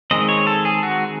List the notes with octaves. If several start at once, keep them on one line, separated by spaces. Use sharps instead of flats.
D#3 G#3 C4 D#5
C#5
A4
G#4
F#4